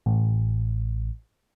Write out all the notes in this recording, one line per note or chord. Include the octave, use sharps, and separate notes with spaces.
A1